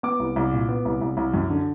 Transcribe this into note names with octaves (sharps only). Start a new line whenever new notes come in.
B3 D6
C2
C2
A#2
B3
C2
C2
C2
F#2
D3